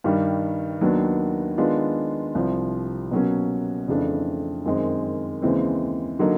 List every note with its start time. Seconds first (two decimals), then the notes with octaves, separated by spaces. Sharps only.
0.04 G2 D#3 G3
0.81 D#2 D#3 F#3 B3 D4
1.58 D#3 G#3 B3 D4 F4
2.35 C2 C3 F3
3.11 B2 F#3 A#3 C#4
3.88 F2 C#3 E3 A3 D4
4.65 F#2 D#3 G#3 C4
5.42 D#2 C#3 E3 G#3 C4
6.19 D3 F#3 A#3 D#4